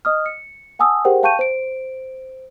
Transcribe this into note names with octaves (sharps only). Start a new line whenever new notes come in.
D#5 D#6 F6
C#7
F#5 G#5 A5 D#6 E6
G4 G#4 A#4 C5 F#5 G5
F5 G5 A5 C#6 G6 D#7
C5 D7